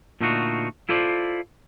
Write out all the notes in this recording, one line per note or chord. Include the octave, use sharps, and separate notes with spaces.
A#2 D3 A3 D#4 F4 F#4
E4 F4 A4 C5 D5